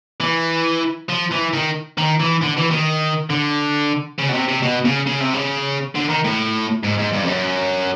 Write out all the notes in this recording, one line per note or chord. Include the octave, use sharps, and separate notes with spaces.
E3
F3
E3
D#3
D#3
E3
D3
E3
D#3
D3
C#3
B2
C3
C3
B2
C#3
C#3
C3
C#3
D3
D#3
A2
G#2
G#2
G2
F2
F#2